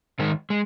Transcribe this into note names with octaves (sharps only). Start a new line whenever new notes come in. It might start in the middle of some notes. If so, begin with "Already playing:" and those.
G#2 D#3 G#3
G#3